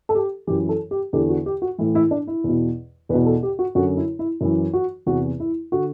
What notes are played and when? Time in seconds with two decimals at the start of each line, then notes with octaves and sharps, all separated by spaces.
0.09 A4
0.15 G4
0.47 F#2 E3 G4
0.69 A4
0.91 G4
1.13 E2 D3 G4
1.29 F#4
1.46 G4
1.62 F#4
1.78 A2 E3 E4
1.95 E4
2.11 D4
2.27 E4
2.44 E2 B2
3.09 E2 B4
3.14 B2
3.26 A4
3.43 G4
3.59 F#4
3.75 F#2 D3 F#4
3.97 E4
4.19 E4
4.41 F#2 E3 E4
4.73 F#4
5.06 E2 C3 E3 F#4
5.40 E4
5.72 D3 F#4